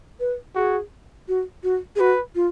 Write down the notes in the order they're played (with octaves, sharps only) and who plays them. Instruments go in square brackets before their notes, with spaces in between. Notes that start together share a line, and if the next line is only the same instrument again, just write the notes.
[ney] B4
[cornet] F#4 [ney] G#4
[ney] F#4
F#4
G#4
[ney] F#4 [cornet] B4
[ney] F4